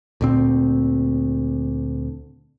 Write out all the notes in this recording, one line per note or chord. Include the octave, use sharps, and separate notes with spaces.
D2 A#2 C4